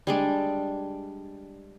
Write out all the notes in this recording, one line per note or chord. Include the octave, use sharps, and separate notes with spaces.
G3 G#3 D4